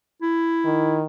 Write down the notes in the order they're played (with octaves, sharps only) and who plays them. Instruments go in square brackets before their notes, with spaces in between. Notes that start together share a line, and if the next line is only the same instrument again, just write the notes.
[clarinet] E4
[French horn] D#3